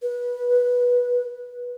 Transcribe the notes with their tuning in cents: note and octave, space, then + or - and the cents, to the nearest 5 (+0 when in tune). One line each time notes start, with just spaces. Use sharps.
B4 -15